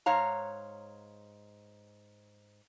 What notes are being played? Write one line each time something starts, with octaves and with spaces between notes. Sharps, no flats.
G#2 C#5 F5 A#5